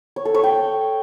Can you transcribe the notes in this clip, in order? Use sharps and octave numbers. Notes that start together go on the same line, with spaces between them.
C#5
A4
C#5
G5